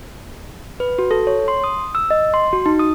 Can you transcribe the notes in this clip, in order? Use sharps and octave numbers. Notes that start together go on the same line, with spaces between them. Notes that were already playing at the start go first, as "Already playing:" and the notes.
B4
F#4
A4
C#5
C6
D#6
E6
D#5
C6
F#4
D#4
D#6